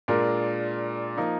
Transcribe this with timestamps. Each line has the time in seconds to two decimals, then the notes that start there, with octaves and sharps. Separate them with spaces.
0.08 A#2 G#3 D4 F4 A#4
1.17 F3 A#3 D#4